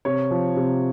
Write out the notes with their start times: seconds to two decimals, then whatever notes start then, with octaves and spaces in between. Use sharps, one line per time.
0.05 C3 C#5
0.31 F3
0.57 C3